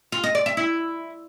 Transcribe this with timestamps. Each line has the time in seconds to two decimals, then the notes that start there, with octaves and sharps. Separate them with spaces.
0.12 F4
0.24 D#5
0.35 D5
0.46 E5
0.57 E4